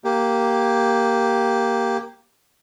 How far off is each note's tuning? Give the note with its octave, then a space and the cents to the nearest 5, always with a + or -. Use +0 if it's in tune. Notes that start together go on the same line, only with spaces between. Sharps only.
A#3 +0 G4 +0